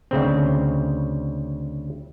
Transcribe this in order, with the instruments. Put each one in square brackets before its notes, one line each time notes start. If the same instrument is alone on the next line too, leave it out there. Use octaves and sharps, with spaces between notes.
[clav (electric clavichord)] D2 C#3 C4